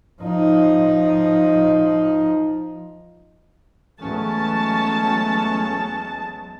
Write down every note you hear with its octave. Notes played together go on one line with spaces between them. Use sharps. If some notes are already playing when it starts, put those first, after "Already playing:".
F3 D#4
E2 F#3 G#3 A3 C#4 A5